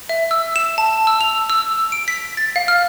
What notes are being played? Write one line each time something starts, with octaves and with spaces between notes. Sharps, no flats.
E5
E6
E7
A5
E6
F7
E6
D7
B6
A6
F5
F6